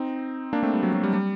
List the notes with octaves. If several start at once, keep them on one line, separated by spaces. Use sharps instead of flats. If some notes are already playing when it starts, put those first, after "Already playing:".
Already playing: C4 D#4
A#3 D4
A3 C4
G3
F#3
F#3
G3
G3